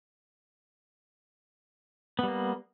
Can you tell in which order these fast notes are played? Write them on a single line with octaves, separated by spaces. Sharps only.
B3 G3 A#3